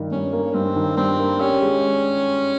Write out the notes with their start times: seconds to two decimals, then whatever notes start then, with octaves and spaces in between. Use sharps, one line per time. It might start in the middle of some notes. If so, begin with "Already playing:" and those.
Already playing: G2 D#3
0.11 G2 C#4
0.33 A#3
0.54 G2 C4
0.76 D#3
0.97 G2 C4
1.19 A#3
1.40 C#4 G4
1.62 G#3